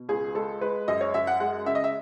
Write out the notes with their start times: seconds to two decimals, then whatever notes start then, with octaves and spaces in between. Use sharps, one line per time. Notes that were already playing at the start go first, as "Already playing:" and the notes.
Already playing: B2
0.09 C#2 G#4
0.35 G#3 A4
0.61 G#3 B4
0.88 F#2 D#5
1.01 C#5
1.14 F#2 E5
1.27 F#5
1.40 G#3 F#5
1.66 C#3 E5
1.75 D#5
1.84 E5